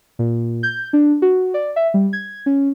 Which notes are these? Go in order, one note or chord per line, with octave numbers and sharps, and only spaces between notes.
A#2
G6
D4
F#4
D5
E5
G3
G#6
C#4